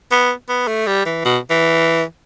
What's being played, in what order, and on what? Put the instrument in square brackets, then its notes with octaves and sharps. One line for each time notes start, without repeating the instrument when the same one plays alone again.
[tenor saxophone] B3
B3
A3
G3
E3
B2
E3